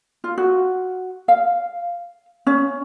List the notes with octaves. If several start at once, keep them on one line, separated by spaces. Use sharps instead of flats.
F4
F#4
F5
C#4